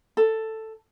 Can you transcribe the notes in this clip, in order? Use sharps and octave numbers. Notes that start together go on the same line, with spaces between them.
A4